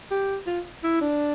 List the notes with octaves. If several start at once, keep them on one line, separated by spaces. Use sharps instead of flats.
G4
F4
E4
D4